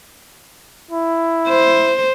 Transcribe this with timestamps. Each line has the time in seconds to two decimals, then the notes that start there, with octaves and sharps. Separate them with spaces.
0.91 E4
1.49 C5